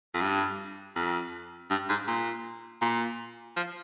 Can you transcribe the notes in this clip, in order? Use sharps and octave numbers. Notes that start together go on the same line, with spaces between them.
F2
G2
F2
G2
G#2
A#2
A#2
F3